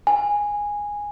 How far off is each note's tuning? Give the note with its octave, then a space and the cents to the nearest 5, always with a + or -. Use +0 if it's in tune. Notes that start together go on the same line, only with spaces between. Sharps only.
G#5 -10